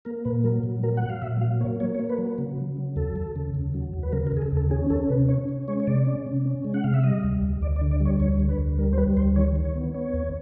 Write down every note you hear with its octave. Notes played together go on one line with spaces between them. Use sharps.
A#3 A#4
A#2 B4
F#3 A#4
A#2
F#3 A#4
F#5
F#3
F5
A#2 E5
F#3 F5
A#3 C#5
A#3 C#5
C#5
A#3
B4
F#3
C#3
C#3
F#3
D#2 A4
D#2
C#3
D#2
F#3
D#2
B4
C#3 A#4
A#4
C#3
G#4
A4
D#2
A4
C#4 G#4
C#4 A4
C3 B4
C#4 C#5
C#4
G#3 C#5
C#5
C3 D5
C#4
C3
C#4
G#3
F#5
C3 F5
E5
G3 D#5
D2
D2
D2 D5
D5
D3
D5
G3
C#5
D2 C#5
D3
B4
D2
G3 A#4
C5
G3 B4
D2 C5
D#3 C#5
D#3
C#5
B3
B3 C#5
D#2